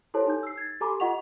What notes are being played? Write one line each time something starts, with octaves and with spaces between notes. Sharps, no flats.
E4 G4 A4 C5 C#5 A5
D#4 G6
E6 C7
G#6 A6
G4 A4 G#5 A#5 B5 D6
F4 D#5 F#5 C#6 F7